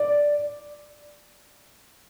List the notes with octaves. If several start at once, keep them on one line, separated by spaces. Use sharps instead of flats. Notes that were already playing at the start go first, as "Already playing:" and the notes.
Already playing: D5